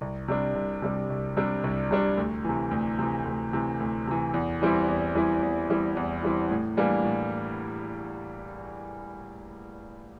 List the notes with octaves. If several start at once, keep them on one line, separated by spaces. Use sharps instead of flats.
C2
C3 G3 D4
C2
C3 G3 D4
C2
C3 G3 D4
C2
C3 G3 D4
D2
C3 E3
D2
C3 E3
D2
C3 E3
D2
C3 E3
E2
E3 G3 C4 E4
E2
E3 G3 C4 E4
E2
E3 G3 C4 E4
E2
E3 G3 C4 E4
A2
E3 G3 A#3 D4
A2